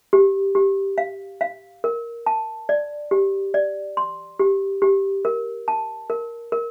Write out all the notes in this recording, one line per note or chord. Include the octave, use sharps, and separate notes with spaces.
G4
G4
F5
F5
A#4
A5
D5
G4
D5
C6
G4
G4
A#4
A5
A#4
A#4